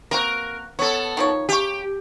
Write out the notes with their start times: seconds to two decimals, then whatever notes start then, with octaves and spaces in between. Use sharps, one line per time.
0.11 A#3 C4 F#4 A#4
0.79 B3 A4 C#5
1.17 D#3 F3 C#5
1.49 C#3 G4 C#6